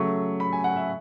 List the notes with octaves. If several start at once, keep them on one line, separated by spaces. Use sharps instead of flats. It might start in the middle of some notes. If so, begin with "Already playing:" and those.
Already playing: C#3 F#3 A3 C#6
B5
G#5
F#5
E5